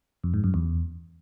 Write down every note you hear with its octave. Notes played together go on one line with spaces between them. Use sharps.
F2
G#2
F#2
E2